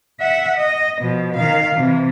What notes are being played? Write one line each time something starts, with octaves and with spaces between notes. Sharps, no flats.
E5 F#5
D#5
B2 F3
D#3 F5
C3 E3